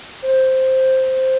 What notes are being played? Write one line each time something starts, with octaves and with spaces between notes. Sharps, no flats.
C5